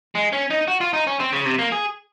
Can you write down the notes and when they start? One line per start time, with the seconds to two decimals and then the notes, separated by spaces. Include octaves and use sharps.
0.15 G#3
0.33 C#4
0.51 D#4
0.68 F#4
0.81 F4
0.93 D#4
1.07 C#4
1.20 C4
1.33 C#3
1.45 C3
1.59 A#3
1.72 G#4